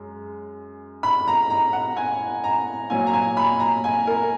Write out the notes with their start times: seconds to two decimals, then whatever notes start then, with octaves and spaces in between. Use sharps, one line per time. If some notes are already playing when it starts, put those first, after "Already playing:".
Already playing: F#2 G#3
1.03 B5
1.28 A#5
1.50 A#5
1.73 F#5
1.97 G#5
2.44 A#5
2.90 A#2 F#3 G#5
3.07 A#5
3.14 G#5
3.37 B5
3.60 A#5
3.84 G#5
4.07 A#4